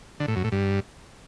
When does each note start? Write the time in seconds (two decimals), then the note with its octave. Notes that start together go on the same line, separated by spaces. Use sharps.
0.20 D3
0.28 A2
0.36 F#2
0.44 A2
0.52 G2